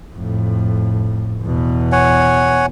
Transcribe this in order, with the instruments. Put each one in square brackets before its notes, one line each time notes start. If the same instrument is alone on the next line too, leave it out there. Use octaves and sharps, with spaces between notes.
[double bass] F2 A2
E2 B2
[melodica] C#5 F#5 G#5